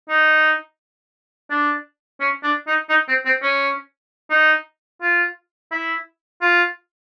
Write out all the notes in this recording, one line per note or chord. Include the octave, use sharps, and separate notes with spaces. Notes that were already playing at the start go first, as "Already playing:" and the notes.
D#4
D4
C#4
D4
D#4
D#4
C4
C4
C#4
D#4
F4
E4
F4